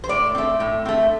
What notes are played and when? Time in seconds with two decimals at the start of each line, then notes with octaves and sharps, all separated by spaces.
0.04 C5
0.09 A2 D5
0.35 A3 C4
0.60 A2
0.85 A3 C4